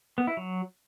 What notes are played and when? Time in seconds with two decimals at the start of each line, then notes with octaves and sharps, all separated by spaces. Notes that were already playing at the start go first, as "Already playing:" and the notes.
0.18 B3
0.27 E4
0.37 F#3